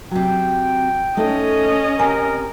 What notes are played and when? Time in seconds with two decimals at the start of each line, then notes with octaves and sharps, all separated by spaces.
0.11 C3 F#3 G5
1.17 A3 C#4 D#4 D#5
2.00 C3 A#4 G#5